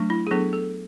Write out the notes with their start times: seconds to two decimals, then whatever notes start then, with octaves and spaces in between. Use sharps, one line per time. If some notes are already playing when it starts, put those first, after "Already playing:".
Already playing: F#3 A3 D4
0.10 E4
0.27 G#4
0.31 F#3 B3 D4 A4
0.53 A4